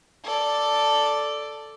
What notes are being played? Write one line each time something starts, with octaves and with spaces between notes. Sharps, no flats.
A4 D5